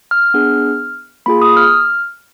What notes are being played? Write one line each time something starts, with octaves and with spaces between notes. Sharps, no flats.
F6
B3 D4 G#4
A#3 F4 G#4 B5
D#6
F6